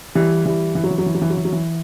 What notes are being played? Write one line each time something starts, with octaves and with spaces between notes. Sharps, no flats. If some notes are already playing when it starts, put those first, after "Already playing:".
E3 G3
E3 G3
E3
F#3
E3
F#3
E3
F#3
E3
F#3
E3
F#3
E3